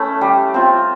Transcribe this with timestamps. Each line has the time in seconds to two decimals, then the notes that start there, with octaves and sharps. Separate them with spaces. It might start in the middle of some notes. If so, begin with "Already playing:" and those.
Already playing: A3 C#4 E4
0.21 G3
0.54 C4 F4